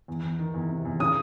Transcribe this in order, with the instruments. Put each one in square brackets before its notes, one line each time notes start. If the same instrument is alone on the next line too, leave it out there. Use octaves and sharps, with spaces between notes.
[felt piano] E2
E2
D#3
E2
C3
E2
[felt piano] C#3 [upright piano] D#6